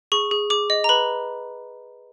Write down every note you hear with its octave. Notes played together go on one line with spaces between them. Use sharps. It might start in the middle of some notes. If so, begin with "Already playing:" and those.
G#4 C#6
G#4
G#4 D6
D#5
A#5
B4 B5